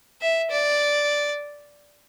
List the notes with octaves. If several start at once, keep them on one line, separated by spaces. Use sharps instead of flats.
E5
D5